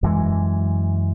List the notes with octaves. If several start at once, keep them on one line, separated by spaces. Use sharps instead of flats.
F#2 E3 G#3